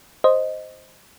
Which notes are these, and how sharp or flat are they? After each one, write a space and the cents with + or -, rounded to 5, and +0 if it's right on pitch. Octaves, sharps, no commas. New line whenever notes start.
C5 +0 D#5 +0